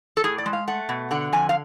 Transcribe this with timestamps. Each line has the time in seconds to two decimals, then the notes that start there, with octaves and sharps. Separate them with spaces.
0.17 A4
0.24 A2 G#4
0.38 D5
0.46 G#3
0.53 F5
0.68 A3 F#5
0.89 B2
1.11 D3 F#5
1.33 F2 G#5
1.49 F5